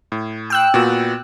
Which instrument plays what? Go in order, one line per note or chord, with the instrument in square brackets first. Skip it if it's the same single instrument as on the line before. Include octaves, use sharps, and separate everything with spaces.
[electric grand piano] A2
[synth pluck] G5 E6 F#6
[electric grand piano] A#2 B3 F#4